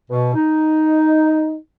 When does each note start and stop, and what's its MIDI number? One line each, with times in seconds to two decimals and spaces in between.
0.11 0.32 47
0.35 1.58 63